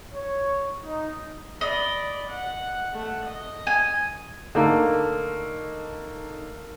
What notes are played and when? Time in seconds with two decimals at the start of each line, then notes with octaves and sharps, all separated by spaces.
0.14 C#5
0.84 D#4
1.61 D5 D#5 B5
2.30 F#5
2.94 A3 F#5
3.26 D#5
3.67 G#5
4.55 D3 A3 A#3 D#4